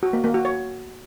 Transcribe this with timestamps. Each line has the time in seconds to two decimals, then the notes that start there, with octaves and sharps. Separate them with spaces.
0.03 F#4
0.13 A#3
0.24 A#3
0.34 F#4
0.45 C#5